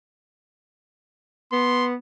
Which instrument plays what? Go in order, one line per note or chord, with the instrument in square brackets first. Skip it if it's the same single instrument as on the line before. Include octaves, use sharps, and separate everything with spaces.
[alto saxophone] B3 [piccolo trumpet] C6